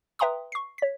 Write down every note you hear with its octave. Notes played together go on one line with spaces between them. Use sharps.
B4 E5 G5 A#5 C6 D#6
C#6 C7
C#5 B6